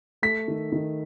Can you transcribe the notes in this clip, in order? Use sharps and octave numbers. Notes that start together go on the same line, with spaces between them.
A3 B6
D#3
D#3